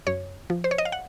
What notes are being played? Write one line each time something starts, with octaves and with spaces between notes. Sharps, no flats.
F#2 C#5
F3
C5
C#5
D#5
F5
F#5